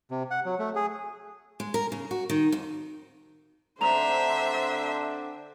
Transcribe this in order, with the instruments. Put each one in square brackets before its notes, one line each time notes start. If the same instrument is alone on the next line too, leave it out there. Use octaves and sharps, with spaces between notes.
[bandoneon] C3
F#5
F#3
A3
G#4
[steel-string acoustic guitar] G#3
A#4
C#3
F#4
D#3
F2
[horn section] D3 C4 D4 [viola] C5 E5 [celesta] A#5 F7